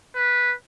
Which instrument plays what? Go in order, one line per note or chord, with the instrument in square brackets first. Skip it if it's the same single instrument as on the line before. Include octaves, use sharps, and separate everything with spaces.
[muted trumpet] B4